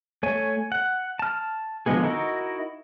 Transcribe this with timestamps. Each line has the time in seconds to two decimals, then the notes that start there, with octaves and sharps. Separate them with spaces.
0.23 A3 C#5 G#5
0.72 F#5
1.19 A5 F6
1.86 D3 F3 G#3 B3 G#4
2.03 D#4 E4 F#4 A#4